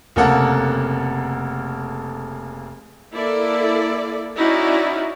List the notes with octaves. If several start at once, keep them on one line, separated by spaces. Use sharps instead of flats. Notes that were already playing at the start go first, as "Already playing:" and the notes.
F1 C#3 A#3 A4 F#5 A#5
A#3 E4 A4 D5
C#4 D#4 E4 F#4 D5